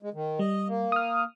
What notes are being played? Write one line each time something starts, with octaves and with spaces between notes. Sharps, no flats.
G#3
D#3
G3 D#5
A#3
D#6 F6